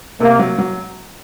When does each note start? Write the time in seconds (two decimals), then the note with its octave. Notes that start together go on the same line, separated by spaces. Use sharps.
0.20 C3 A#3
0.39 F#3
0.58 F#3